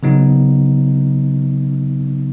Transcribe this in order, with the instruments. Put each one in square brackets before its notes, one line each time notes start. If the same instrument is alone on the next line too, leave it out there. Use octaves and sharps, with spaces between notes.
[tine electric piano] C#3 F#3 B3 D#4